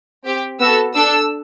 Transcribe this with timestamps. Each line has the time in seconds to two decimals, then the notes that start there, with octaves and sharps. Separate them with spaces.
0.25 C4 G4
0.60 B3 F#4 A4 E6
0.95 D4 A4 E6